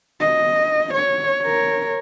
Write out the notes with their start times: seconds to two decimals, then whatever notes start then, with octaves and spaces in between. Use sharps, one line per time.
0.20 D#5
0.94 C#5
1.42 A#4 C#5